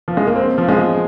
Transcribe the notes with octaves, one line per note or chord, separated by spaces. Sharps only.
F3
G#3
A#3
C4
F3
G#3